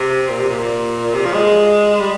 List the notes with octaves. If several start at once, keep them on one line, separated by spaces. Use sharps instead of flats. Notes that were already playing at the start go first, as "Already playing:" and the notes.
Already playing: C3
A#2
C3
A#2
C3
F3
G#3
G3